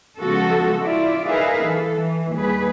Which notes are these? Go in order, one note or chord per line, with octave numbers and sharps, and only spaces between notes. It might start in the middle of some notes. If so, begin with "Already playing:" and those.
C#3 F3 G#3 B3 F#4 A4
E4 F4 D5
D#4 G#4 A#4 B4 E5 F5
E3 A4
E3
D#2 G3 G#4 B4